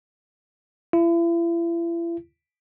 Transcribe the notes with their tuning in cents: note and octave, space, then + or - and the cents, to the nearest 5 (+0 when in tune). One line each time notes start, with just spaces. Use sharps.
E4 +40